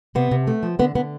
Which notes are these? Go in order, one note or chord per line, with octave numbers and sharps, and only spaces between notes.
C3 B3
C3
A3
F3
D3 B3
D3 B3